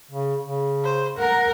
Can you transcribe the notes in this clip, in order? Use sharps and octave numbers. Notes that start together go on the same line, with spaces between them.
C#3
C#3
C5
A#4 F#5